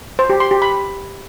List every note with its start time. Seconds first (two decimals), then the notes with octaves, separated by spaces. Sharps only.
0.19 C5
0.30 G4
0.40 C6
0.51 G4
0.62 B5